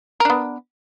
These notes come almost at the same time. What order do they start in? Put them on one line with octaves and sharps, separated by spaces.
A#4 D4 B3